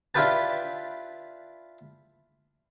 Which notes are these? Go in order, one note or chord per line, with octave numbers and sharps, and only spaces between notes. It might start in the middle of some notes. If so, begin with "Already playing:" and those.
D4 E4 F4 G4 B4 A5